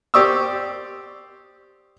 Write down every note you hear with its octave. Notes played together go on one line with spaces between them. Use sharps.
G4 C5 D5 C#6 D#6 E6